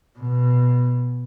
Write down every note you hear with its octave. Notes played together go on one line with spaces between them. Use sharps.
B2